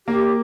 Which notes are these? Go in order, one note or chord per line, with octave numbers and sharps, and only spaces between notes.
A#3 G4